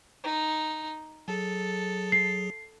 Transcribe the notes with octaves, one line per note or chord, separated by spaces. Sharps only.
D#4
F#3 G#4 A4
C7